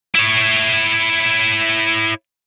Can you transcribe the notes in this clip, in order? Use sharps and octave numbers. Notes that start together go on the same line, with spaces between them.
E4 C#5